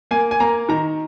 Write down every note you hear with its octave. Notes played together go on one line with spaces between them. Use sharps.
A#3 G#5
G#5
A#3 A#5
D#3 A#5